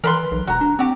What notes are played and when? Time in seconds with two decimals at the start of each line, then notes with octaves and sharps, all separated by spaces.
0.04 E3 A#4 B4 C6
0.31 B1
0.47 E1 F#4 A#5
0.61 D4
0.79 C4 F#4 G4